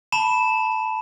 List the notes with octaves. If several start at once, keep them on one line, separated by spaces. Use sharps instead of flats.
A5 B5 E7